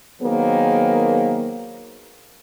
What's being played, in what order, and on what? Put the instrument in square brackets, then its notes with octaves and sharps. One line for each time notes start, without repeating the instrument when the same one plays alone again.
[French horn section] D#3 F#3 A#3 B3 G#4 C5